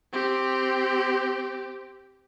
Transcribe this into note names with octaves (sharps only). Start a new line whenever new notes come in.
C4 G4